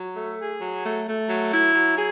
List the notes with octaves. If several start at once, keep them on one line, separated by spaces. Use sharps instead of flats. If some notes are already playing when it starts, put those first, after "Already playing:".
Already playing: F#3
A3
G#4
F#3
A3
A3
F#3
E4
F#3
G#4